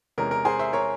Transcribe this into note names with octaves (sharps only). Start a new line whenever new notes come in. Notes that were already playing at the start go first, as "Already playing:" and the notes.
E2 C3 E3 G#3 C#4 A#4
A#4
G#4 C5
C5 E5
A#4 C#5